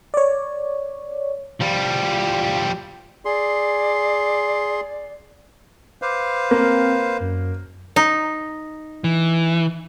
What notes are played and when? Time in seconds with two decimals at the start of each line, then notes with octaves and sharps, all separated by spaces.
0.14 C#5 D5
1.61 F3 G3
3.25 G#4 D5 C6
6.02 B4 C5 F5 D6
6.51 A#3 C4
7.20 F#2
7.96 D#4
9.04 E3